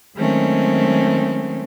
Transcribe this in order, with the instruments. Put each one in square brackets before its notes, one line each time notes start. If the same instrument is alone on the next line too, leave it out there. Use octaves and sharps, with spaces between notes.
[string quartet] D#3 F#3 G#3 A3 C4 C#4